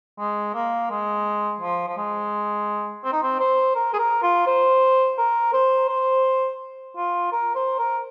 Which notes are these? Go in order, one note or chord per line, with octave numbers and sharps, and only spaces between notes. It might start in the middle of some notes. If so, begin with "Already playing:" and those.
G#3
A#3
G#3
F3
F3
G#3
C4
D#4
C4
C5
A#4
G#4
A#4
F4
C5
A#4
C5
C5
F4
A#4
C5
A#4